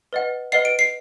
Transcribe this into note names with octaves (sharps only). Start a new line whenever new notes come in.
B4 D#5 F#5
B4 D#5 F#5 C7
D7
C7